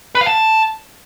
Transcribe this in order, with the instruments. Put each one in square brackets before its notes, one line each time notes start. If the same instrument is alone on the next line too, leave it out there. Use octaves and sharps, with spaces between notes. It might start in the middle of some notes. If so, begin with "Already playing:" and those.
[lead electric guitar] B4
F5
A5